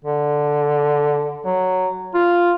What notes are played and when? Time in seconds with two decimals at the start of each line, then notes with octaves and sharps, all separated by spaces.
0.04 D3
1.46 F#3
2.14 F4